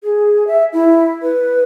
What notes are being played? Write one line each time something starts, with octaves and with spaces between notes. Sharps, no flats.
G#4
E5
E4
B4